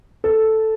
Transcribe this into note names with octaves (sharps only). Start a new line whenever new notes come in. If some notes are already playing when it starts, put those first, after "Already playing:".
A4